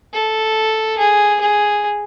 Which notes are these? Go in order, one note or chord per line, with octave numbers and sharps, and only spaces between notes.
A4
G#4
G#4